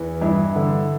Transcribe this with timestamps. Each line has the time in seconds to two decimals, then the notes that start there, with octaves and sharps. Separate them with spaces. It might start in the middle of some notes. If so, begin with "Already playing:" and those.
Already playing: E2 E3
0.21 G2 E4
0.56 D3